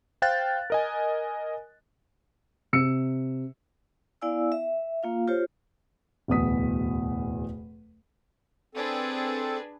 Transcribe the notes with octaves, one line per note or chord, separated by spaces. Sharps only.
C5 F5 G5 F#6 A6
A#4 D#5 G#5
C3 E6 C#7
B3 E4 D5 F5 G#5 E6
E5
A#3 F4 F5
F4 G4 C5 C#5
D1 E2 B2 D#6 B6
C4 D4 G#4 A4 B4